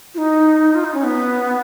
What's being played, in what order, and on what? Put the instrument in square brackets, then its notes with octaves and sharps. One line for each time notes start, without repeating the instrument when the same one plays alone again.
[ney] F4
D#4
F4
D#4
C#4
B3